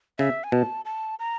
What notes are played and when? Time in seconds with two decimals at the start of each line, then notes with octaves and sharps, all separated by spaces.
0.18 C#3 E5
0.44 G#5
0.52 B2 A5
0.85 A5
1.19 A#5